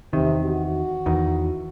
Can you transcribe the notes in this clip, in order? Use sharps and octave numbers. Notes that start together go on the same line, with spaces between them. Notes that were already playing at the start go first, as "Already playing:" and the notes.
E2 C3 D#3
F#4
E2 D#3